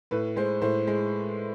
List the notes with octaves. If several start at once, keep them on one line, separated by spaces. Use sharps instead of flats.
A2 B4
G#3 C5
A2 C5
G#3